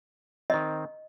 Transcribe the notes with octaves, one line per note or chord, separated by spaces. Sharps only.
D#3 C4 D#5